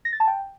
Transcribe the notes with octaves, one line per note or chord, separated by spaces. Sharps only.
A#6
A6
A5
G5